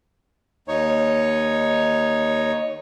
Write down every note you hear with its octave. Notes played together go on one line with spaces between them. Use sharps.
D#2 D#4 C#5